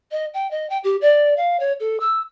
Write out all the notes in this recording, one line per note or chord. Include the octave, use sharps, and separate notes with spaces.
D#5
G5
D#5
G5
G4
D5
F5
C#5
A4
E6